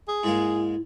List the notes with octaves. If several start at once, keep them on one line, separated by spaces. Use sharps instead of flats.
G#4
G#2 G#3 A#3 E4